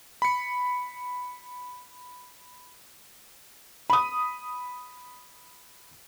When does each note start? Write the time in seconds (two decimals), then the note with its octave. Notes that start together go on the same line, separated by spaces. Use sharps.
0.22 B5 C#7
3.90 B5 D#6